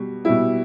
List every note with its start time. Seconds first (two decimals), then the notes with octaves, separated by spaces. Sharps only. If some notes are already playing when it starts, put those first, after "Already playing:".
Already playing: B2 G3
0.25 B2 G3 E4